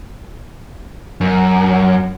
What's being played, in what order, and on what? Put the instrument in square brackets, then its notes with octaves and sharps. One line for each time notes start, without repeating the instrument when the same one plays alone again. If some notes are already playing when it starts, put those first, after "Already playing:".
[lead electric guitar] F#2